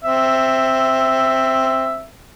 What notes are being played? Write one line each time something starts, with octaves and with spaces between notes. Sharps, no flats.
C4 E5